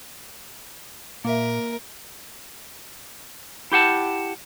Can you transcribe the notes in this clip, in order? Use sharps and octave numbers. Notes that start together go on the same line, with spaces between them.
A#2 A#3 A#4 E5
E4 G4 F#5 A5